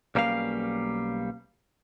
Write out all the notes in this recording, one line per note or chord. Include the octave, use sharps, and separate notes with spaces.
B1 G3 A#3 C#4 F5